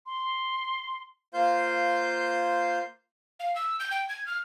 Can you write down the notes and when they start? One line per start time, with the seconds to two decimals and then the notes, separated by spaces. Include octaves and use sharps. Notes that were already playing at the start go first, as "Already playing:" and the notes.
0.06 C6
1.34 A#3 F4 C5 F5 C6 G6
3.40 F5
3.55 E6
3.80 G6
3.91 G5
4.09 G#6
4.26 F6